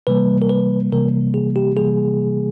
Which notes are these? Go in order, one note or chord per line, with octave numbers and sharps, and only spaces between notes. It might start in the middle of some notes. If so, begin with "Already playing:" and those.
C3 E3 G3 A#3 B4
A#4
B4
C3 E3 G3 A#3 A#4
G#4
G4
C3 E3 G3 A#3 G#4